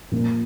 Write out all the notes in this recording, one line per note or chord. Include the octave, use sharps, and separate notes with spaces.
A#2 F3 A#3